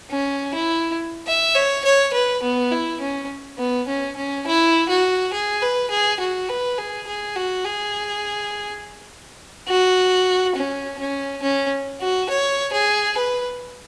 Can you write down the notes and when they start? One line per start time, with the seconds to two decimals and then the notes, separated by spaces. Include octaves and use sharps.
0.11 C#4
0.54 E4
1.27 E5
1.55 C#5
1.84 C#5
2.13 B4
2.43 B3
2.71 E4
3.00 C#4
3.59 B3
3.88 C#4
4.16 C#4
4.46 E4
4.89 F#4
5.33 G#4
5.62 B4
5.90 G#4
6.20 F#4
6.49 B4
6.78 G#4
7.07 G#4
7.36 F#4
7.65 G#4
9.68 F#4
10.56 C#4
10.99 C#4
11.42 C#4
12.01 F#4
12.30 C#5
12.73 G#4
13.17 B4